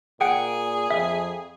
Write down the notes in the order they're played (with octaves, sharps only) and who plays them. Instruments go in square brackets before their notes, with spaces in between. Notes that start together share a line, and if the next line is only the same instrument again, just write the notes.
[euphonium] A#2 [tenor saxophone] G#4 [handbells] F#5 G5
[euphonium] F2 [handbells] E5